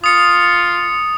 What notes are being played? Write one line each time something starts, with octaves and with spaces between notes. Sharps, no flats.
F4 D#6 C#7